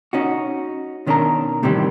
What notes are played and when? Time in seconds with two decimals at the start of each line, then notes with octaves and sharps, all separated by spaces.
0.13 C#4 D#4 F#4
1.07 B2 D#3 C#4 D4 A#4 A#5
1.63 A2 C3 D#3 E3 G3 E4